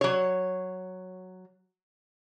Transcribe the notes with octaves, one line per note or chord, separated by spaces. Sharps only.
F#3 C#5